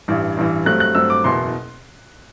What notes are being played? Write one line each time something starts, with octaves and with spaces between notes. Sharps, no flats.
A1 G2 E3
A1 G2 E3
G2 F#3 A3 C4 F#6
F#6
G2 F#3 A3 C4 E6
D6
F#1 E2 B2 C6